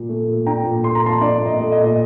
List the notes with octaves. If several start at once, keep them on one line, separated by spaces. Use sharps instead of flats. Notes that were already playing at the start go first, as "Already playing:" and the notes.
Already playing: A#2
A3
A#2
D4 G5 A#5
A#2
A3 C6
A#5
A#2 A5 C6
D4 D5
A#2
D#5
A3
D#5
A#2
D#5